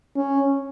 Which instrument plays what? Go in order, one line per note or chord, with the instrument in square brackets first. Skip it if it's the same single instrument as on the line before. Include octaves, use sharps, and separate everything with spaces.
[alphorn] C#4